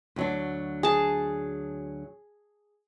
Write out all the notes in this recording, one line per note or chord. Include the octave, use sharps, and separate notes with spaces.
D2 F#3 D4
G#4 A5